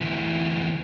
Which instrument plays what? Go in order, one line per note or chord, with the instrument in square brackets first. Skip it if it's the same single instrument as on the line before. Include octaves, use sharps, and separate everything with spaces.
[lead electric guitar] D2 E3